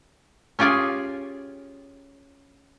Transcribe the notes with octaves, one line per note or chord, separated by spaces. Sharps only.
C#4 F4 G4 G#4 G#5